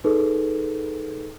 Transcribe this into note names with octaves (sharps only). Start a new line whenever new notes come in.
D#4 G#4 A4 B4